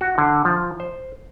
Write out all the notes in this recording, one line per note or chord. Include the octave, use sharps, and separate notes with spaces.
F#4
D3
F3
C5